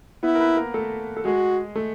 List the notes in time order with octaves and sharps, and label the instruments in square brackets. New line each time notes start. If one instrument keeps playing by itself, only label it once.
[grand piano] B3 B4 [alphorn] E4
[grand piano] A#4
B3 B4
A#3 A#4
A3 A4
A4
[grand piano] G#3 G#4 [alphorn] F#4
[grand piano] A3 A4